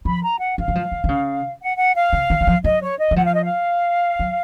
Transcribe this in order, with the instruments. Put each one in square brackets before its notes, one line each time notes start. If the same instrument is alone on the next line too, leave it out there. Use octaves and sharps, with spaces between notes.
[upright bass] F3 [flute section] B5
[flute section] A#5
F#5
[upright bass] D#3 [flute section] F5
[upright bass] F#3
F3
D#3
D#3
C#3
[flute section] F#5
F#5
F5
[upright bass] C#3
D#3
F#3
F3
[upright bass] F#3 [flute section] D#5
[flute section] C#5
D#5
[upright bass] F#3
[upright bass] F3 [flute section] F#5
[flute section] F5
D#5
F5
[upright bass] F#3